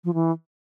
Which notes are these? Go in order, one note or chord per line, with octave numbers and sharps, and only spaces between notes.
F3
E3